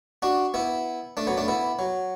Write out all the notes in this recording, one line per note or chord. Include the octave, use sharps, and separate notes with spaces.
D4 F#4
B3 E4
A3 D4
F#3 B3
A3 D4
B3 E4
F#3